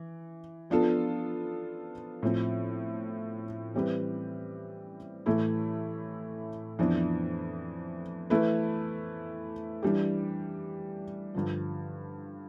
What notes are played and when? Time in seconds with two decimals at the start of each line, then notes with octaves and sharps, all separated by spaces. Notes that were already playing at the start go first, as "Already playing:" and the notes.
Already playing: E3
0.70 F3 B3 D4 F4 A4
2.23 A2 F3 C4
3.74 E3 G3 C4 G4 B4
5.26 A2 E3 A3 E4
6.79 F2 E3 B3 D4
8.30 E3 A3 E4 B4
9.83 E3 G3 D4 G4
11.34 G2 D3 F3